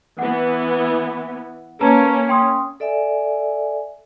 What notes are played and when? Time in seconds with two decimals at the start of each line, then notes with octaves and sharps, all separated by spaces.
0.19 E3 B3 F#5
1.81 A#3 C#4 B4 A5 A#5
2.29 G5 C6 D#6
2.80 A4 D5 E5 G#5